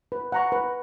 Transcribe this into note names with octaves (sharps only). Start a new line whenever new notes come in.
B4
F#5 A#5 C#6
B4